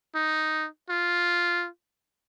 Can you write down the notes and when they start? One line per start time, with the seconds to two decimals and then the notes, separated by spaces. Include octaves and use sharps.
0.15 D#4
0.90 F4